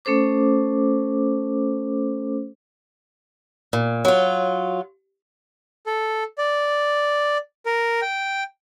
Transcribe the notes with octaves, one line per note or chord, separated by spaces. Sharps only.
A3 C#4 A4 C5 D6
A#2
F#3 F4
A4
D5
A#4
G5